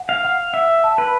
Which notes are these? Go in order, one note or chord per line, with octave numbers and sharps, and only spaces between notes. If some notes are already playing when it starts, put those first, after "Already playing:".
Already playing: F#5
F5
F#5
E5 F#5
A5
B4